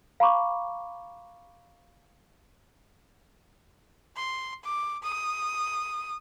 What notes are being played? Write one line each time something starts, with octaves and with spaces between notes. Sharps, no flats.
F5 A#5 B5 C#6 D6
C6
D6
D#6